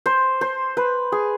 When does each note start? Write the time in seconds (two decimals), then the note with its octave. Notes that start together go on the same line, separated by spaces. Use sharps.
0.06 C5
0.41 C5
0.77 B4
1.12 G#4